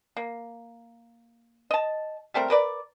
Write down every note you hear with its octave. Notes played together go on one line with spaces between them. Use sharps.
A#3
D#5 A5
G3 A3 C4 A#4
A#4 B4 D5